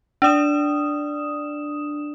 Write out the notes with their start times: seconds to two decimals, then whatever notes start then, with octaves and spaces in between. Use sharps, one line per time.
0.22 D4 D5 D#6 E7